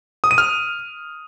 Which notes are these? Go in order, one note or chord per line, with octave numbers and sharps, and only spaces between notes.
D#6
D#7
F6